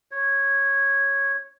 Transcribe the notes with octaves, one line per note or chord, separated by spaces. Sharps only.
C#5